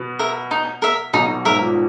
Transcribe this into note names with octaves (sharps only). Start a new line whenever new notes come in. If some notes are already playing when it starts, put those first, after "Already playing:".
Already playing: B2 B3
A#4 E5
D#4
A#4 E5
B1 B2 D#4
G#2 A#4 E5
A#2